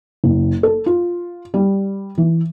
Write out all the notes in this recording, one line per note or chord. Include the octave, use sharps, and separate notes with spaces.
F#1
A4
F4
G3
E3